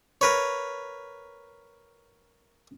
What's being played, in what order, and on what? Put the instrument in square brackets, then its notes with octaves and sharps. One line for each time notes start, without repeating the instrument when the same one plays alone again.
[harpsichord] A#4 B4 C#5